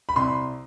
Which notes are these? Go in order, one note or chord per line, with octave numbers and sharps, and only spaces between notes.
B5
C2 C6